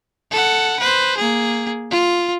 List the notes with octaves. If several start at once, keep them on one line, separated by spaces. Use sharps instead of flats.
A4 F#5
B4 C5
A#3 G#4
F4